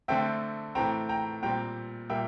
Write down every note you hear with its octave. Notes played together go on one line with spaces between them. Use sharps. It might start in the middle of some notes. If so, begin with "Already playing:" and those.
D3 A3 C4 E5 G5
A2 E3 A3 C4 G5 A#5
G5 A#5
A#2 G3 C4 G5 A#5
A#2 G3 A#3 E5 G5